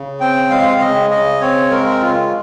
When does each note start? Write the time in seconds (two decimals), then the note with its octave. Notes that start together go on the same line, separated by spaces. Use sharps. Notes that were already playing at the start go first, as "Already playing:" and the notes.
Already playing: C#3
0.20 C4 G5
0.50 G#3 F5
0.80 C#3 D#5
1.10 C#3 D#5
1.41 C4 C#5
1.71 G#3 A#4
2.01 C#3 F4